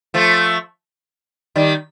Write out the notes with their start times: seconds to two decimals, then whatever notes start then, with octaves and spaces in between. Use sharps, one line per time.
0.14 F3 A3
1.56 D#3 G3